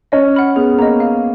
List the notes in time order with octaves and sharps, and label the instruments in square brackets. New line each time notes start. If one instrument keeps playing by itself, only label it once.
[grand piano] C#4 [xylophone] D#5
[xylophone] F#5 B5 F6
[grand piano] B3 [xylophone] G#4
[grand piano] A#3 [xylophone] D#5 A#5
[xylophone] F5